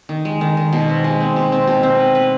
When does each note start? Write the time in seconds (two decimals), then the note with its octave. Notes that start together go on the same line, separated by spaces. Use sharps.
0.09 D#3
0.25 G#3
0.41 D#3
0.57 D#3
0.73 B2
0.89 C4
1.04 G#3
1.20 C4
1.36 B2
1.52 C4
1.67 B2
1.83 C4
2.00 B4
2.15 B4